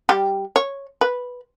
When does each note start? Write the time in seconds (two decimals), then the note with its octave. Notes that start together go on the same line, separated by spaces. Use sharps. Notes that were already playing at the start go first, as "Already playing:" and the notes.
0.09 G3 G4
0.56 C#5
1.01 B4